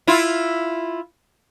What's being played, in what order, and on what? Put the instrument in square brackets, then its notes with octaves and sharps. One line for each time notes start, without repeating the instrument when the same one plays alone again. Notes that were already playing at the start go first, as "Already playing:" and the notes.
[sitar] E4 F4